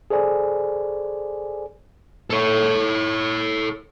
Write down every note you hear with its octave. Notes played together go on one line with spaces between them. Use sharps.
G#4 A4 C5 D5 G#5
A4 C#5